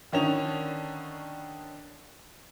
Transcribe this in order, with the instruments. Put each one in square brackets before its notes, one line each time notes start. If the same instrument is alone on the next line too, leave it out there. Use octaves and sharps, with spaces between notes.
[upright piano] D3 D#3 C#4 D#4 F7